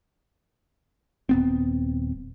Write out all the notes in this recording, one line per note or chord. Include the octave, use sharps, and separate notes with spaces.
D#1 B3 C4